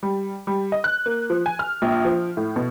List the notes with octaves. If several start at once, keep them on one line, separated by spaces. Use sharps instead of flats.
G3
G3
D#5
F#6
A#3
F3
G#5
F6
A#1
F3
A2
B2